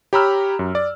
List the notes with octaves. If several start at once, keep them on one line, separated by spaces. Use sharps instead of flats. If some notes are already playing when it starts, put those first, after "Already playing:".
G4 C#5 A#5 B5 E6 F6
F#2
D5